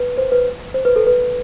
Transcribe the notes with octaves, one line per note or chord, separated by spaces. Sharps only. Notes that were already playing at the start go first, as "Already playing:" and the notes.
Already playing: B4
C5
B4
C5
B4
A4
B4